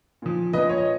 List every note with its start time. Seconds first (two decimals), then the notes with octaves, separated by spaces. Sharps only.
0.22 A#2 F3
0.53 A#2 F3 B4 D#5
0.69 C#5
0.78 D#5